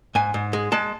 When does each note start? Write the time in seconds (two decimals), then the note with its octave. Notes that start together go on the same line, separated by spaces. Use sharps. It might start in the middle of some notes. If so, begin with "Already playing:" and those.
0.15 G#2 G#5
0.34 G#2
0.53 G#3
0.72 G#3 A5